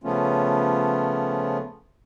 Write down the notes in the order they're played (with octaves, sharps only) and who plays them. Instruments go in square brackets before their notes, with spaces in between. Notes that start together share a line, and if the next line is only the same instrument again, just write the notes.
[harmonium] C#3 F3 A3 B3 C#4 F4